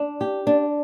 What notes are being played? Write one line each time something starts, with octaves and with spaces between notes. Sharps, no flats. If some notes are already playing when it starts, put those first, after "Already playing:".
Already playing: D4
G4
D4